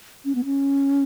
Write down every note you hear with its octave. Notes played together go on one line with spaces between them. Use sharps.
C#4
B3
C#4